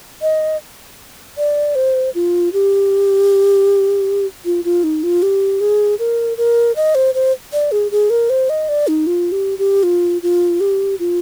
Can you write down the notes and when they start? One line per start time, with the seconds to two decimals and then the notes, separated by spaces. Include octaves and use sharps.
0.22 D#5
1.37 D5
1.75 C5
2.15 F4
2.53 G4
4.45 F4
4.65 F4
4.84 D#4
5.03 F4
5.23 G4
5.60 G#4
5.99 A#4
6.37 A#4
6.76 D#5
6.95 C5
7.15 C5
7.53 D5
7.72 G#4
7.91 G#4
8.10 A#4
8.30 C5
8.50 D#5
8.69 D5
8.88 D#4
9.07 F4
9.32 G4
9.59 G4
9.83 F4
10.23 F4
10.60 G4
11.00 F4